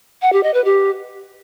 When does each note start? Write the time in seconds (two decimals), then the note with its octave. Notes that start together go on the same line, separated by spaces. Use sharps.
0.22 F#5
0.33 G4
0.43 D#5
0.54 B4
0.65 G4